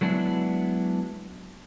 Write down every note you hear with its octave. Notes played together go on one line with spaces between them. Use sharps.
F#3 G#3 B3 D4 E4